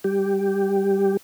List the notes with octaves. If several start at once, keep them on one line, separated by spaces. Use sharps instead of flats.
G3 G4